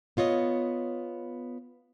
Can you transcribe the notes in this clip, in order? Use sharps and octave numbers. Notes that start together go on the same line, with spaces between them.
B3 F4 C#5 D#5